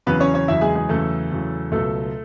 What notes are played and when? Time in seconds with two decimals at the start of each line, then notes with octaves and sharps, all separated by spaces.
0.06 E2 C#3 F#3 B3 B4
0.20 C#4 C#5
0.34 C#4 C#5
0.48 E2 C#3 F#3 E4 E5
0.61 G#3 G#4
0.75 G#3 G#4
0.89 E2 C#3 F#3 A3 A4
1.31 E2 C#3 F#3
1.72 C#2 B2 F#3 A3 A4